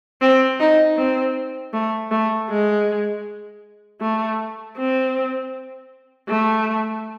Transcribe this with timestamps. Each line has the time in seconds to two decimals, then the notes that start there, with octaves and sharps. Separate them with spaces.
0.21 C4
0.60 D#4
0.97 C4
1.73 A3
2.11 A3
2.50 G#3
4.01 A3
4.77 C4
6.28 A3